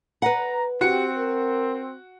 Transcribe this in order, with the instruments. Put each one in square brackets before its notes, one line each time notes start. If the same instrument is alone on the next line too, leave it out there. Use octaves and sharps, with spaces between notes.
[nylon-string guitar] B4 F#5 [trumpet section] A#5
[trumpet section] C4 [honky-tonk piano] F#4 C#7 [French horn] G4
[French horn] A#4